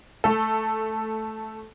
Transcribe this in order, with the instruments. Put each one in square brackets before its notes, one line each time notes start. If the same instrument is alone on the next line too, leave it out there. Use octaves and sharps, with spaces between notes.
[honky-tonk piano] A3 A4